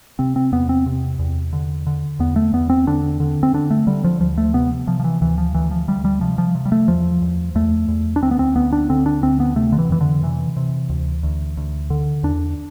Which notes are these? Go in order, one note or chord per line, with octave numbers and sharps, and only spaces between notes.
C3 C4
C4
E2 B3
C4
C3
E2
D3
D3
E2 B3
A3
E2 B3
C4
D3 D4
D3
C4
D3 D4
A3
D3 G3
F3
D2 F3
A3
C3 B3
C3 F3
F3
E3
D2 E3
F3
D2 E3
F3
D2 G3
G3
C3 F3
F3
C3
G3
A3
E2 F3
E2
E2 A3
E2
D4
D2 C4
B3
C4
D2 B3
D4
D3 C4
D4
D2 C4
B3
C3 A3
D3
E3
F2 E3
D3
C3 E3
C3
D2
D2
D2
D3
E2 D4